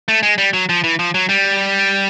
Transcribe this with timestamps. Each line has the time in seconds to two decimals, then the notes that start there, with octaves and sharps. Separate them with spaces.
0.08 A3
0.23 G#3
0.38 G3
0.54 F#3
0.69 F3
0.84 E3
0.99 F3
1.14 F#3
1.29 G3